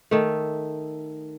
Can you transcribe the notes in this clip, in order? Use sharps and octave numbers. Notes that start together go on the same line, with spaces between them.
D#3 A3